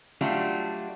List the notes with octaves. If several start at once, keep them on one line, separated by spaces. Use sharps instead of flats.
F#3 G3 A3 D4 F4 F#4